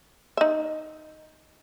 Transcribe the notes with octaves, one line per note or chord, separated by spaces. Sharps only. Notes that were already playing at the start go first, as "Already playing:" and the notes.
D#4 E5